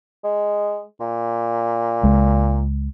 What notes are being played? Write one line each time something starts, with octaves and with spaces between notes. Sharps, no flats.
G#3
A#2
C#2 G#3